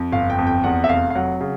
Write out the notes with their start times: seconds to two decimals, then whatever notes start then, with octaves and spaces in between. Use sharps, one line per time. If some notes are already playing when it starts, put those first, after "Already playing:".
Already playing: F2
0.12 G1 F5
0.30 G5
0.38 F2
0.47 G5
0.64 E2 F#5
0.84 E5
0.89 F1 F5
1.10 F5
1.15 F#3 F#5
1.41 C#3